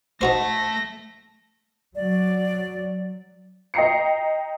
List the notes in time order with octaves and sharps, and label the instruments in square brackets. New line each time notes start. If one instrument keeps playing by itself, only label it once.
[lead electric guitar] A3 A5 [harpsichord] D#4 F#4 C5 [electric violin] A#6
[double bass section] F#3 [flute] D5
[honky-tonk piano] D#5 G5 A#5 C7 C#7